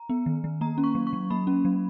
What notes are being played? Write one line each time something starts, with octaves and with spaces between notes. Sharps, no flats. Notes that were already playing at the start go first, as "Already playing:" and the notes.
Already playing: A#5
B3
D#3
D#3
A#3 A#5
C#4
C#6
F#3
C#6
F#3
A#3 B5
C#4
F#3